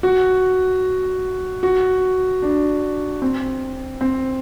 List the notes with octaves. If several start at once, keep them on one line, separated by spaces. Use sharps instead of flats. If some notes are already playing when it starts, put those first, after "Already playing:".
F#4
F#4
D4
C4
C4